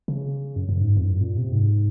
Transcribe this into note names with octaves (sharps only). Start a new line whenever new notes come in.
C#3
F#2
F#2
G#2
F2
F#2
A#2
C3
G#2